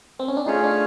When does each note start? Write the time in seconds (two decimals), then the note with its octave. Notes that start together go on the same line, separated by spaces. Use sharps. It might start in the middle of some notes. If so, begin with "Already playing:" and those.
0.19 C4
0.28 C#4
0.37 D4
0.46 A3 C#4 D#4 F4 G#4 C#5
0.64 D4